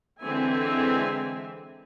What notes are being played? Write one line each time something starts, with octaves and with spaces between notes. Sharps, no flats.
D3 E3 G#3 C4 E5 G#5